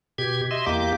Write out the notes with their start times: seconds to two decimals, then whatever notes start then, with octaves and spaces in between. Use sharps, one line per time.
0.18 B2 G4 G#6
0.51 D#5 E5 C6
0.66 E2 A#3 G4 D6